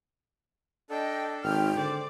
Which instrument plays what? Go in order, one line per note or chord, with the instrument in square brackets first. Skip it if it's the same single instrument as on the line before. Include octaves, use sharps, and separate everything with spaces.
[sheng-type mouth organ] D4 A4 [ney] D#5 [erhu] G5
[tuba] G#1 [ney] G5 [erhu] F6
[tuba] D3 [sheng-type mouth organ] C5 [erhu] D5